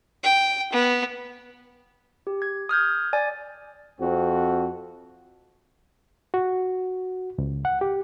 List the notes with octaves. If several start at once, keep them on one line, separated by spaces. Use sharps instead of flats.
G5
B3
G4
G#6
D#6 F6 G6 G#6
D5 G#5
F2 C4 F#4
F#4
C#2
F#5
G4